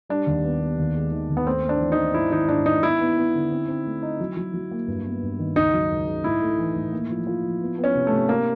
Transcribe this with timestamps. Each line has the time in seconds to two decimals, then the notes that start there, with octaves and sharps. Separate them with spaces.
0.09 G3 D4
0.27 D#2
0.44 B3
0.61 B3
0.78 D#2
0.95 G#3
1.12 D#3
1.30 D#2
1.37 B3
1.46 A3 C4
1.64 A3
1.69 D4
1.80 E3
1.92 D#4
1.97 E3
2.14 G#2 E4
2.31 D#3 D#4
2.49 G#2 D4
2.66 G#2 D#4
2.83 B3 E4
3.00 B3
3.17 B3
3.34 D3
3.52 C4
3.68 C4
3.86 A3
4.03 D#4
4.20 F#3
4.37 F#3
4.54 F#3
4.71 A#3
4.88 G2
5.05 B3
5.23 G2
5.39 D#3
5.56 C#2 D#4
5.73 F#3
5.90 C#2
6.07 C#3
6.24 A2 E4
6.42 A3
6.59 E3
6.76 A2
6.93 A#3
7.10 F3
7.27 F4
7.44 F3
7.61 B3
7.78 B3
7.84 C#4
7.95 C3
8.07 A3
8.12 C3
8.29 A#3 D4